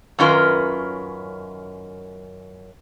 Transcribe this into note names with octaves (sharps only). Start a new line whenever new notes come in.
F#2 D#3 C#4 F4 A#4 B4